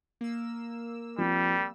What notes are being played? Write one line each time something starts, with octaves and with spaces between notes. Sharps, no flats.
A#3 E6
F3 G3 C4